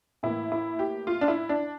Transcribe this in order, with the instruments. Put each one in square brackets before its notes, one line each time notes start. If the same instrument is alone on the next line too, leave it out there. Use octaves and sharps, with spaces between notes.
[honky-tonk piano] A2 E3 A#3 E4
E4
G4
F4
D4
E4
D4